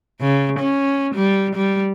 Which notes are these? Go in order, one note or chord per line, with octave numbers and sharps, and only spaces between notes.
C#3
C#4
G3
G3